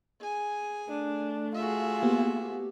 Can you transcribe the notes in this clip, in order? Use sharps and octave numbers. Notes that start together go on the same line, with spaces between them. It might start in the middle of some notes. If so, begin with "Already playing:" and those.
G#4 G#5
A3 D4
F4 F#4 G#4 E5
A#3 B3 G4